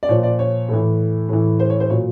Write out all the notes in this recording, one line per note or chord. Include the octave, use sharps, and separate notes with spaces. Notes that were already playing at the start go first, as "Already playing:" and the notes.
D5
A#2 F3 C#5
D5
C#5
A2 E3
A2 E3
C5
C#5
C5
A#2 F#3 C#5